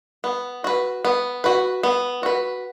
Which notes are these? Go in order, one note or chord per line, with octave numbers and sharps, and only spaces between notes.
B3
F#4 B4
B3
F#4 B4
B3
F#4 B4